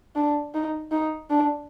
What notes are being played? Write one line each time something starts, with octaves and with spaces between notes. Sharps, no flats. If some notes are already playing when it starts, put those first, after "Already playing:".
D4
D#4
D#4
D4